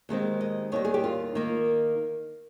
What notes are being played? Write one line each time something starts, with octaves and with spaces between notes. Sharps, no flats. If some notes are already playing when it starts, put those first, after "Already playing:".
D#2 D#3 G#3 C4
D#5
D#2 D#3 G3 C#5
G#4
G4
F4
D#3 A#3